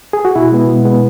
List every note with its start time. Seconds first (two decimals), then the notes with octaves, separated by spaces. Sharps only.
0.13 G#4
0.25 F#4
0.36 B2 E4
0.52 G#3 B3
0.68 B2
0.85 G#3 B3